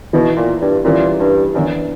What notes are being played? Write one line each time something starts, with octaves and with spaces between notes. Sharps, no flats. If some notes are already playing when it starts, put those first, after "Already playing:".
B2 E3 B3 E4
A#2
G2
A#2 E3 G3 C#4 E4
G2
F#2 E3 B3 D4